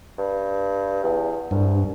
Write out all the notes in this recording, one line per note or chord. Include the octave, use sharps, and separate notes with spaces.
G2
E2
C2 G2